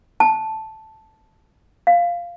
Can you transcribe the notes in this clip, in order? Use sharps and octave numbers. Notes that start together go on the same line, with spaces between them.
A5
F5